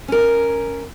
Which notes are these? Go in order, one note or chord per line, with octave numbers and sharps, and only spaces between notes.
C#4 A#4